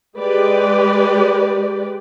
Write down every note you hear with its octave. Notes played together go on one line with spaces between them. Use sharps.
G#3 G4 B4 D5